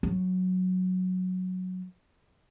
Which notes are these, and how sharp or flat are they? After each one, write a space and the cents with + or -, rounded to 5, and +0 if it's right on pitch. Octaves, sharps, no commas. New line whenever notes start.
F#3 -5